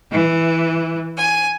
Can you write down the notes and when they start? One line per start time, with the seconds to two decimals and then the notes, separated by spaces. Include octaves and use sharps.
0.11 E3
1.18 G#5